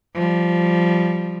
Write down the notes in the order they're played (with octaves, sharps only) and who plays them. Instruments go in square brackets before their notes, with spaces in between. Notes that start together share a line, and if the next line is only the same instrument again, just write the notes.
[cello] F3 G3